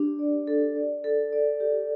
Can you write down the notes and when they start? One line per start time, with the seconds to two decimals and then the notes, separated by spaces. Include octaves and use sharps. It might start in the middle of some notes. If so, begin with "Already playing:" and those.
Already playing: D4 G4
0.19 D5
0.47 A4
0.76 D5
1.04 A4
1.33 D5
1.61 G4